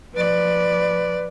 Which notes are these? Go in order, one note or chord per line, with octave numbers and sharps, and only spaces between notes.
F3 B4 D5